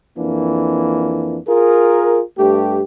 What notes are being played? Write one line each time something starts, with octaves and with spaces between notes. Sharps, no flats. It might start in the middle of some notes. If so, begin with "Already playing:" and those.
F2 E3 A#3 D4
F4 G#4 A#4
G2 A3 G4